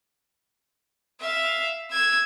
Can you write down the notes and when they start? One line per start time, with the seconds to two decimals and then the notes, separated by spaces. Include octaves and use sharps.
1.20 E5 F5
1.92 E6 G#6